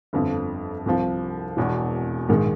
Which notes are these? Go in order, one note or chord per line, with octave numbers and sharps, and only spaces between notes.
G1 F2 D3 F3
C2 C3 F3
E1 E2 B2
A#1 G#2 D#3 G#3